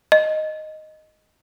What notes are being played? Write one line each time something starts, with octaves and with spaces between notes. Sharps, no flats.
D#5